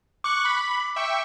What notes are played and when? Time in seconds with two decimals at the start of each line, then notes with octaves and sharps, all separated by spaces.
0.24 C#6 D6 F#6
0.45 B5
0.96 E5 G5 C#6